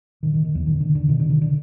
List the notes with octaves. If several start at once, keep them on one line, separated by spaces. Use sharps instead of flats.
A#2 D#3
D#3
D#3
E2 E3
A#2 D#3
D3
D3
B2 D#3
D3
D#3
D3